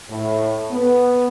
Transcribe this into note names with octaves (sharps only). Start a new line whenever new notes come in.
A2
B3